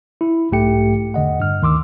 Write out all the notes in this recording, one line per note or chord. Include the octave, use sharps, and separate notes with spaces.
E4
B1 G#2 A3 G4 G5 C#7
E2 D3 D#5 F#5
G2 F6
D2 D#3 C6 D6 E6